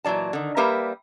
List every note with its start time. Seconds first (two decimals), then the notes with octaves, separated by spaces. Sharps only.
0.04 A#2 E3 F#3 D5 A5
0.33 D3 D#3
0.57 G3 A#3 G4 A#4 B4 E5